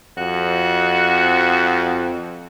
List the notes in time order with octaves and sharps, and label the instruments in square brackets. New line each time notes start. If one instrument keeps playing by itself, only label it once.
[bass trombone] F2 [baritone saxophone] F#4